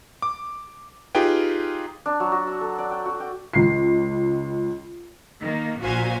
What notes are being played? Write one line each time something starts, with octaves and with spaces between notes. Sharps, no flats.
D6
D#4 F4 G4 G#4 B4 G5
D4
F#3
F#4
E6
A4
D5
G5
F#4
G5
C#2 C7
D#3 A#3
A#1 A#2 F#4 C5 F5 G#5